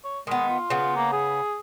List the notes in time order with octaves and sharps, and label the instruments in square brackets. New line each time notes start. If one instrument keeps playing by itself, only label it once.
[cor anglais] C#5
[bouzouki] D#3 B3 [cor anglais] G#3
[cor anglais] F4
[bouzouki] C#3 B3
[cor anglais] A#3
G#4